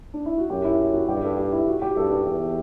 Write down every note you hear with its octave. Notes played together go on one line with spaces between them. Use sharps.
D4
E4
F#4
F#2 G4
E4
F#4
G2 G4
A4
G4
E4
F#4
G4
G2 A4
A4
E2